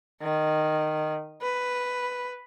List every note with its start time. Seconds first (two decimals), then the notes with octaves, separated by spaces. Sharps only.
0.22 D#3
1.42 B4